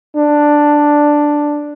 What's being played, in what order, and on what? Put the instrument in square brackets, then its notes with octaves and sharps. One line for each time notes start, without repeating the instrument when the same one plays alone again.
[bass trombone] D4